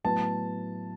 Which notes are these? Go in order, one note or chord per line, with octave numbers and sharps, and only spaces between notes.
A2 F#3 B3 A5